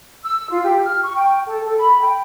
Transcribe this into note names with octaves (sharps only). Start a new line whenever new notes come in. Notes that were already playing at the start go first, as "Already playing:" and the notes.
E6
F4
G4
F6
C#6
G5
A4
A4
B5
G5